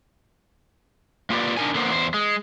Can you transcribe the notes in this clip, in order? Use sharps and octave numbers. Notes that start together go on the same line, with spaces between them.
A#3 F4 G4 B4 D5
D4 D#4 A#4 G#5
D3 A#3 B3 C5
E2 C5
G#3